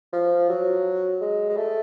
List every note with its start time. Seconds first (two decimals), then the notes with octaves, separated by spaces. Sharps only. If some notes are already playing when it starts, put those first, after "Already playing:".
0.13 F3
0.49 F#3
1.21 G#3
1.49 G#3
1.57 A3